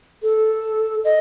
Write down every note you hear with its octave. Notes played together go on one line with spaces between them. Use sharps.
A4
D#5